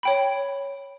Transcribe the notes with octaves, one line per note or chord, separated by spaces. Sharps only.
C#5 G5 B5